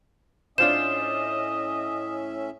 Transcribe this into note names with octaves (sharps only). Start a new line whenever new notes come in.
A2 C#4 D4 F4 C5 D#5 E5 E7